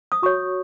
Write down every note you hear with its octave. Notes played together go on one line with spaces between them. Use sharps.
D#6
F#4 C#5 C#6